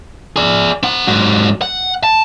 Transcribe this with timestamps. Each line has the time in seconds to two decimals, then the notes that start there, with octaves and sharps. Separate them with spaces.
0.36 G#4 D5
0.83 C4 F#5
1.08 G#2 F#3
1.62 F#5
2.03 A5